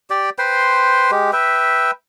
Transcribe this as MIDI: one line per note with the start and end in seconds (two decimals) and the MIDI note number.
0.10 0.30 67
0.10 0.30 74
0.10 0.30 79
0.39 1.11 71
0.39 1.11 72
0.39 1.11 79
0.39 1.11 84
1.11 1.31 56
1.11 1.31 67
1.33 1.91 71
1.33 1.91 76
1.33 1.91 79